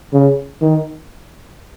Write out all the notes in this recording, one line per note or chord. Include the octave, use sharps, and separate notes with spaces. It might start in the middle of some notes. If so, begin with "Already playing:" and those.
C#3
D#3